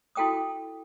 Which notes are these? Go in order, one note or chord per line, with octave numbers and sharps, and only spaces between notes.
E4 F#4 A4 G5 D6 D#6